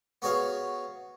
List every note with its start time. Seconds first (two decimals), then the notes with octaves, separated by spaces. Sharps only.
0.22 B3 F#4 G#4 C#5 F5